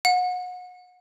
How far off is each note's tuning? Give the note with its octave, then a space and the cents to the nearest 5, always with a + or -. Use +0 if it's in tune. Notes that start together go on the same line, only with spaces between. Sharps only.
F#5 -30